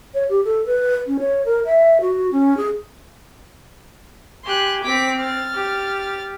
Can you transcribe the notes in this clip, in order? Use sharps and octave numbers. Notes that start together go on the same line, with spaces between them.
C#5
G4
A4
B4
C#4
C#5
A#4
E5
F#4
C#4
G#4
G4 G#5 C6 F#6
C4 D6 B6
F6 A6
G4